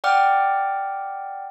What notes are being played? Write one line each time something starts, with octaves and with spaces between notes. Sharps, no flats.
D5 F#5 G5 D6 F6